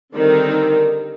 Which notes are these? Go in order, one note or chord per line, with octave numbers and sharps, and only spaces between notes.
D3 D#3 G3 C4 D#4